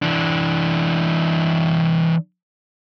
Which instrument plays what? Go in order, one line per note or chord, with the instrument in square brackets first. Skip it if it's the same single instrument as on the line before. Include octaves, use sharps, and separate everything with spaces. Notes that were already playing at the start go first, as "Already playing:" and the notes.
[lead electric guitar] E3 D4